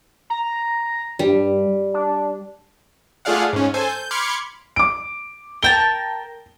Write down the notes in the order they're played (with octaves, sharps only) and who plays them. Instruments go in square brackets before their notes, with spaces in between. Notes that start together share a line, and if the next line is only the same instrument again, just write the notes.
[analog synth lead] A#5
[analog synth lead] G2 [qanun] G3
[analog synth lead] D4
[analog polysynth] A3 F4 G#4 D5 F5 F#5
G#2 C#4
A4 C5 G#5
G6
B5 C6 D6 F6 G#6 C#7
[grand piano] D6 D7
[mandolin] A#4 G5 A5 [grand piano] G7